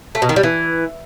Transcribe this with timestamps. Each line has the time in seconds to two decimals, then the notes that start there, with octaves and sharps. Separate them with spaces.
0.15 A3
0.22 B2
0.29 D#3
0.36 G3
0.43 E3